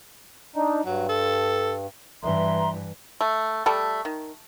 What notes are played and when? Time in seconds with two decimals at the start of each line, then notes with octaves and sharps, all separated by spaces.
0.56 D4 D#4
0.85 G2 F#3
1.09 A4
2.23 G2 E3 E5 A#5 C6
3.21 A3
3.66 G3 A3 A4 G5
4.05 D#3